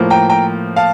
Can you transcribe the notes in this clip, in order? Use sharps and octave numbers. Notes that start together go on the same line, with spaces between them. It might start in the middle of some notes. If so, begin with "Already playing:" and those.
Already playing: A2 F3 A#3
G5 A#5
G5 A#5
F5 A5